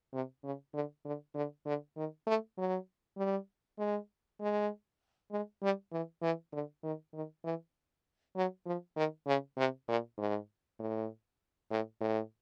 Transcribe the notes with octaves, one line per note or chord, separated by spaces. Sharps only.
C3
C#3
D3
D3
D3
D3
D#3
A3
F#3
G3
G#3
G#3
G#3
G3
E3
E3
D3
D#3
D#3
E3
F#3
F3
D#3
C#3
C3
A#2
G#2
A2
A2
A2